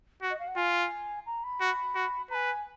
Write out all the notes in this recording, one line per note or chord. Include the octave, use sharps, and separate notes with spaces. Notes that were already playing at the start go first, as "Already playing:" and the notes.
F#4
D#5
F5
F#5
F4 G#5
A#5
B5
F#4
F#4
B4 G#5 A#5